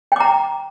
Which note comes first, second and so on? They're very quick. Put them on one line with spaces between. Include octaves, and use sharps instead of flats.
G5 D6 A#5